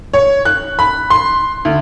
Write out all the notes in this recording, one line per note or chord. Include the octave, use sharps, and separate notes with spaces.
C#5
F#6
B5
C6
D2